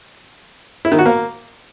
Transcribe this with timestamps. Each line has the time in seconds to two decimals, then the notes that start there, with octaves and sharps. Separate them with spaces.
0.85 E4
0.92 D#3
0.99 F#4
1.06 A#3